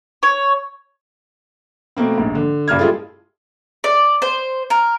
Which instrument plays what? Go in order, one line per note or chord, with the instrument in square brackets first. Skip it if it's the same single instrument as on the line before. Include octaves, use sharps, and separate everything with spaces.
[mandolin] C#5
[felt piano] B2 A3 A#3 C4
A#1 D#2 G#2
D3
F#1 G2 D4 F6 G#6
G3 G#3 E4 F4 G#4 A4
[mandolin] D5
C5
A#4